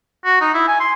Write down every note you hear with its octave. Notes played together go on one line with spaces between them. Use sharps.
F#4
D#4
E4
G#5
C6